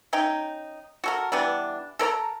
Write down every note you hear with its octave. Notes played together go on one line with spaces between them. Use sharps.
C#4 D#4 G5
F#4 A4 A#4
E3 G3 B3 D4
A4 A#4 C#5 A#5